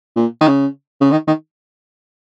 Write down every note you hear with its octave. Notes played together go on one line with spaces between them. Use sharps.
A#2
D#3
C#3
C#3
D#3
D#3